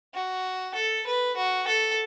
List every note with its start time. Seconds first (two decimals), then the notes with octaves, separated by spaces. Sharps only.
0.14 F#4
0.75 A4
1.07 B4
1.37 F#4
1.67 A4